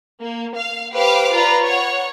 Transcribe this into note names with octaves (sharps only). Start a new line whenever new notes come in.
A#3
F5
G4 B4 C5 F5 G5 D6
F4 B4 D5 A#5
C#5 F#5